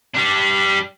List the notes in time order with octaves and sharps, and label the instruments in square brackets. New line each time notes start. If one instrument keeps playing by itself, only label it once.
[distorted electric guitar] G3 D4